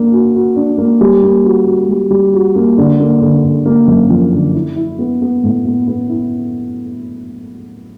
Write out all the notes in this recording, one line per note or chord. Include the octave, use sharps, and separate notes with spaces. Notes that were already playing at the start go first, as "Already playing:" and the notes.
Already playing: A#3 D4
F#4
F#4
D4
A#3
G3
A#3
F#4
F#4
G3
G3
F#4
A#3
D3
A#3
D3
D3
A#3
F#2
F3
D3
E4
E4
B3
B3
A2
B3
B3
E4